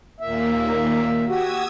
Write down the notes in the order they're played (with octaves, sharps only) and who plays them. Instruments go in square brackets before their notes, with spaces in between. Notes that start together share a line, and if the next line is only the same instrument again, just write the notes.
[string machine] D#2 A#3 [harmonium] A#2 E5
[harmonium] F#4 G4 [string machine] D#6 E6 G#6